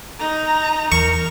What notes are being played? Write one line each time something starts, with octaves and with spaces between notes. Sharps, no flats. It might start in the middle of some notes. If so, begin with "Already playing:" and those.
D#4 A#5
E2 A#4 C#6